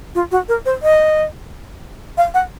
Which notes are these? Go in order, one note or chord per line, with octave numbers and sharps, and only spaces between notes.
F4
F#4
A#4
C5
D#5
F5
F#5